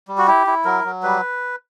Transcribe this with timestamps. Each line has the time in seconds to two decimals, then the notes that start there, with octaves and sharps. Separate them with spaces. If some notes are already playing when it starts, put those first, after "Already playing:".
0.08 G3
0.18 F#4
0.27 E4 G4
0.47 E4
0.65 F#3 A#4
0.84 F#3
1.03 G3 B4